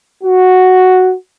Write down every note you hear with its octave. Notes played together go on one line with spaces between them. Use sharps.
F#4